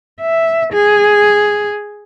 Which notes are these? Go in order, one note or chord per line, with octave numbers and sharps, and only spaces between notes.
E5
G#4